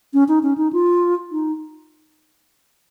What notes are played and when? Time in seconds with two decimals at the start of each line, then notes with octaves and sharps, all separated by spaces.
0.14 C#4
0.28 D#4
0.43 C#4
0.58 D#4
0.73 F4
1.32 D#4